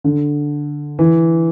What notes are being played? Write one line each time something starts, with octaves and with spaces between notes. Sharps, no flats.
D3
E3